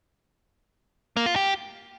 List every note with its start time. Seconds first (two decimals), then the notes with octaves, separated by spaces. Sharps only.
1.17 A#3
1.26 F4
1.36 G4